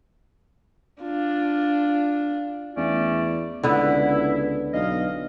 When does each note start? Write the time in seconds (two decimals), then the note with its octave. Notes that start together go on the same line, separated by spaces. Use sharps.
1.02 D4 F4
2.77 E2 A3 C#4 D5
3.63 C#2 D3 B3 E4
4.74 B1 D#5 F5